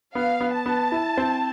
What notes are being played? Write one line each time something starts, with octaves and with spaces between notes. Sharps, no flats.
B3 F5
B3
A5
B3
E4
C4